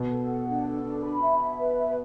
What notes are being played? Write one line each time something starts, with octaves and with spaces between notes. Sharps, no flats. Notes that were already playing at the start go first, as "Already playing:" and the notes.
Already playing: B2
A4
F#5
D4
A4
D4
B5
E5
E5
B4
E5